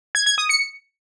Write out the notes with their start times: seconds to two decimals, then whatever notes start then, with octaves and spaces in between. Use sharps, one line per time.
0.15 G#6
0.26 G#6
0.38 D#6
0.49 C#7